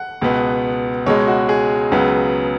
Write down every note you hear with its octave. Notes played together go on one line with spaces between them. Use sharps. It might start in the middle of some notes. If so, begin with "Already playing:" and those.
Already playing: F#5
C#2 B2 B3
C#2 B2 G#3 C#5
F#4
G#4
C#2 C#3 F#3 B3